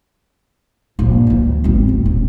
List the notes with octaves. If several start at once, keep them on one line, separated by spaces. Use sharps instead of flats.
A#1 G2
D2 E3
G#1 C4
F#1
D#1